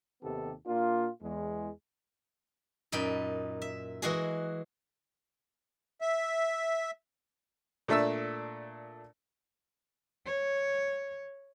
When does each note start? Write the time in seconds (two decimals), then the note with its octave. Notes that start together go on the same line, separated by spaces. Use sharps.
0.23 D#2 C3 D#3 B3 G4 A4
0.67 A#2 A#3 D4 F4
1.22 E2 G#3
2.92 F#2 A#2 D#4 G5 B5
3.62 E5
4.02 E3 G#3 F#4 G#4
6.01 E5
7.88 A#2 A3 D4 E5 A5 E6
10.26 C#5